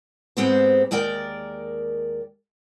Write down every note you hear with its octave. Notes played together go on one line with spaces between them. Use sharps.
G#2 G#3 B3 C4 G4 C5
D#2 G#3 A#4 D5 G5